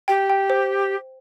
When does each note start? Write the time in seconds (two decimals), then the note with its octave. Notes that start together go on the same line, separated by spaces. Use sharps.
0.08 G4 G5
0.30 G5
0.50 C5